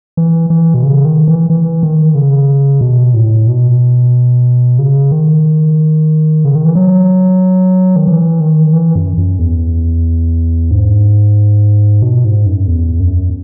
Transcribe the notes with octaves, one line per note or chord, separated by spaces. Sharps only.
E3
E3
B2
C#3
D#3
E3
E3
D#3
C#3
B2
A2
B2
C#3
D#3
C#3
D#3
E3
F#3
D#3
E3
D#3
E3
F#2
F#2
E2
G#2
B2
G#2
F#2
E2
F#2